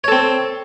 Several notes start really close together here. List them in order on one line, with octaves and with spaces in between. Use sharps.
C#5 A4 C4